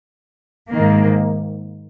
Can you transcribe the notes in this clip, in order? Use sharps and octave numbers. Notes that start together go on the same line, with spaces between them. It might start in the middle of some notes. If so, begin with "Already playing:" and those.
G#2 D#3 A#3